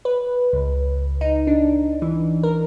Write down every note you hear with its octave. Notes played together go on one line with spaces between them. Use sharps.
B4
C#2
D#4
D4
E3
A#4